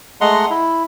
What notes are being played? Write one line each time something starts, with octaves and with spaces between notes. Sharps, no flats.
G#3 A3 D#5 F#5 A#5 C6
E4